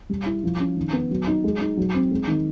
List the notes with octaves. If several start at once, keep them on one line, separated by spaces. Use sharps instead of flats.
G3
E4
F3
C#4
D#3
B3
F#3
D#4
G#3
D#4
F#3
C4
G#3
D#3